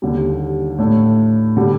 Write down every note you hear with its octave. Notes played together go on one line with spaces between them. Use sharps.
D#2 D3 G3
A2 A3 D4
D3 G3